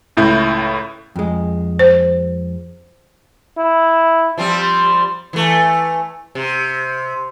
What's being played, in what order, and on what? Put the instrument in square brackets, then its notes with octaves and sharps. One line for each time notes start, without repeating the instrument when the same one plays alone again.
[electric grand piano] C#2 A2 E4 G6
[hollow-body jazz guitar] F2 G#3
[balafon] C5
[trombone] E4
[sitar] F3 G3 C4
E3 A3
C3